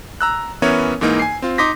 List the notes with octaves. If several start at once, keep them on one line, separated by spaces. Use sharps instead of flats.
A#5 E6 F#6
E3 B3 C#4 A#4 C#5 E5
G#2 E3 A#3 D#4
G#5 C7
C4 F4
D#4 C6 D6 D#6 A#6 B6